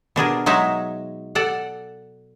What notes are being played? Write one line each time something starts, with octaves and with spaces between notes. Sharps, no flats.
B2 D4 G#4 A#4
F#3 G#3 D#4 E5
A4 D5 F#5